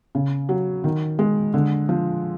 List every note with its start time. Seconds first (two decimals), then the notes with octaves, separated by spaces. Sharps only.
0.15 C#3
0.49 F#3
0.84 D#3
1.19 G#3
1.54 D3
1.89 F3